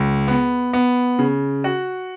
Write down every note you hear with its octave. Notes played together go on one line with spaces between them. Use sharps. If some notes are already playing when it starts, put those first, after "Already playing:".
Already playing: C#2
B3
B3
C#3
F#4